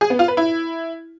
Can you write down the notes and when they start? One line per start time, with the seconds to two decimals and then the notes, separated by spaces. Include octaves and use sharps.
0.01 G#4
0.10 B3
0.19 F4
0.28 B4
0.37 E4